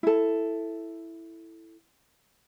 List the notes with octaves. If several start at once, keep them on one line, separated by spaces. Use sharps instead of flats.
E4 A4